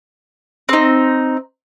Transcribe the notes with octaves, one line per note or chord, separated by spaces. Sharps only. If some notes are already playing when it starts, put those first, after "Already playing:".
C4 D#4